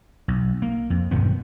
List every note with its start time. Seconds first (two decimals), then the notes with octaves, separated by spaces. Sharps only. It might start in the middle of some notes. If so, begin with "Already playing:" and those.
0.28 B1
0.62 A#3
0.90 F2
1.11 B1 G2 D#3 B3